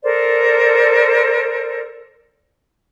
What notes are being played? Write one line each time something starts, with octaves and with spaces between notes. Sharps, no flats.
A4 A#4 C5 D5